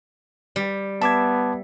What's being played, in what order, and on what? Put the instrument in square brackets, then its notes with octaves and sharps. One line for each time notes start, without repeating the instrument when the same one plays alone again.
[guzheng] G3
[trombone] B3 [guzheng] E5 [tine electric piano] A5 D6 G#6